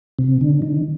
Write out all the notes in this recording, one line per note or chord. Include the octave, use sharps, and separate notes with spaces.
C3
D3
D#3